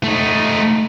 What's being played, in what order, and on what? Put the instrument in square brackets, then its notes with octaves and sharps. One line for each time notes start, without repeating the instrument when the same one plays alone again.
[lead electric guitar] A3 D#4